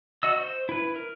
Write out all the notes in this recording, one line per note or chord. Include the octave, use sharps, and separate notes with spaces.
F#4 D#5 E6
C5
E4 B4
A#4